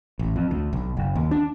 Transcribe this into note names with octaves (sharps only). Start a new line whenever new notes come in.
A1
F2
D2
B1
F#1
D#2
D4